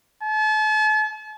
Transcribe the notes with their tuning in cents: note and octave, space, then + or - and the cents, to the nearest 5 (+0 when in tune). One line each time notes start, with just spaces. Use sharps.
A5 -40